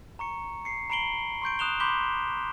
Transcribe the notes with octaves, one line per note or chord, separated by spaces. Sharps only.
A#5 C#6 C#7
C7 C#7
A#5 B5 C7 D7 F#7 G7
C6 C#6 G6 D7
D#6 F#6 E7 F7 G7
B5 C6 D6 G6 B6 G7